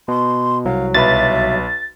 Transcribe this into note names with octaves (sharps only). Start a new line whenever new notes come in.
B2 C6
C2 F#3 F5
B1 B4 E5 B5 A6